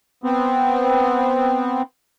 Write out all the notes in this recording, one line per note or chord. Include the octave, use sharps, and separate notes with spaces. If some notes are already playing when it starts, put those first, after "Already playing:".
B3 C4